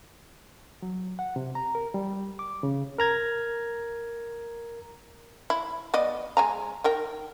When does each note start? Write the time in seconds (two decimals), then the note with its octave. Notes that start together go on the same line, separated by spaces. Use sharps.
0.82 F#3
1.19 F#5
1.36 C3
1.55 A#5
1.75 A#4
1.94 G3
2.39 D6
2.63 C#3
2.98 A#4 A#5 G#6
5.50 E4
5.94 B3 D5 D#5
6.37 G#3 G#5 A#5
6.84 D#3 A#4 G5